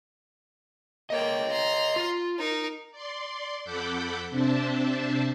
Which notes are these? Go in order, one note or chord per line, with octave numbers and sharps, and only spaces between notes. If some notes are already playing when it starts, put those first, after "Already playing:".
A#3 C#5 D#5 G5
A#5 C6
F4
D#4 A#4
D5 C6
F2 A4 F#5 B5 D6 G6
C3 C4 D4 C5 E5 A5